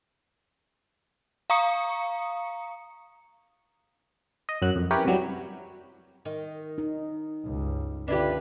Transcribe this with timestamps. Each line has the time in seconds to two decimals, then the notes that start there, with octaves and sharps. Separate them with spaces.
1.50 F5 A#5 C#6 D#6 C#7
4.49 D#5
4.62 F#2 F#3 F#6
4.76 F2
4.91 C#4 E4 G4 A#4 B4 C#5
5.05 C3 E3 F#3 G3
6.25 D#3
6.78 D#4
7.45 C#2 G2
8.08 D3 C#4 D4 E4 F4 G4 B4